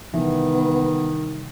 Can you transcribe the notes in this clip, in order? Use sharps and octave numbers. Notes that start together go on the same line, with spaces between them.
C2 D#3 E3 B3